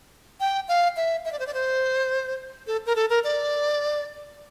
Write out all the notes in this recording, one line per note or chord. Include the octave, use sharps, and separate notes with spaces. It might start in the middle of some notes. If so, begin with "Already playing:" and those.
G5
F5
E5
E5
D5
C5
D5
C5
A4
A#4
A4
A#4
D5